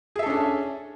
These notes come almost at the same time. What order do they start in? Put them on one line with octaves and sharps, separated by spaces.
G#4 E5 A4 C#4 D4